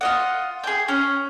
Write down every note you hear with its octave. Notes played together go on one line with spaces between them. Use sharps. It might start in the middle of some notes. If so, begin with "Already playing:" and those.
F4 D#5 F#5
G#4 G5
C#4